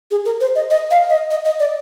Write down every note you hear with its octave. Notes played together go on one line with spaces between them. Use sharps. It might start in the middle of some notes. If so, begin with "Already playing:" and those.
G#4
A#4
C5
D#5
D#5
F5
D#5
D#5
D#5
D5